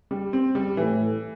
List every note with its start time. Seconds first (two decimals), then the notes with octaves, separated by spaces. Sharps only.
0.11 G3
0.33 C4
0.55 G3
0.77 A2 E3